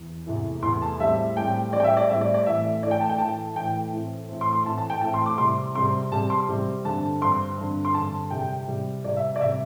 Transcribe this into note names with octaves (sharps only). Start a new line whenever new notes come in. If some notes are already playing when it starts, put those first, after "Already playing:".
Already playing: E2
E2 C3 E3 A3
E2 C3 E3 A3 C6
A5
A2 G3 C4 E5
A2 G3 C4 G5
A2 G3 C4 D5
G5
E5
D5
A2 G3 C4 E5
D5
D5
A2 E3 A3 E5
A2 E3 A3 D5
G5
A5
G5
A2 E3 A3 A5
A2 E3 A3 G5
A2 E3 A3 C4
A2 E3 A3 C4
C6
C6
A2 E3 A3 C4 A5
A5
G5
A2 E3 A3 C4 A5
C6
D6
C3 G3 C4 C6
C3 G3 C4 C6
C3 G3 C4 A5
C6
C3 G3 C4
G2 D3 C4 A5
G2 D3 C4 C6
G2 D3 C4
C6
G2 D3 C4 A5
C3 G3 C4 G5
C3 G3 C4
C3 G3 C4 D5
E5
D5
C3 G3 C4 E5